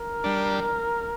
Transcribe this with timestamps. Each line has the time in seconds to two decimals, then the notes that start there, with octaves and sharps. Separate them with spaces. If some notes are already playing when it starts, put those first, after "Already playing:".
Already playing: A#4
0.24 G3 D4